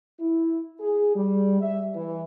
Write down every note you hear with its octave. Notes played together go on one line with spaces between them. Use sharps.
E4
G#4
G3
E5
E3